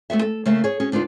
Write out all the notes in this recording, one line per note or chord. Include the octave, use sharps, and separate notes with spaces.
A3 B3 F#4 E5
A4
C#3 A3 A#3 E5
G#4 C#5
C#4 F#4 G#4
D2 D4 D#4 F4 B4